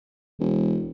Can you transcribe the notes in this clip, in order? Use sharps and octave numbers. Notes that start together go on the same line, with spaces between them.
E1